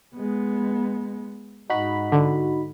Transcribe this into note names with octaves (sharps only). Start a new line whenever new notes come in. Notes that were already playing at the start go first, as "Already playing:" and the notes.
G#3 B3
G#2 D#4 F#4 B5
D3